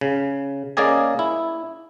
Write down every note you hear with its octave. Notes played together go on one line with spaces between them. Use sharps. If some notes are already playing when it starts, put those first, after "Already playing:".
C#3
A#3 C#4 G#4 D5 D#5 G#5
E4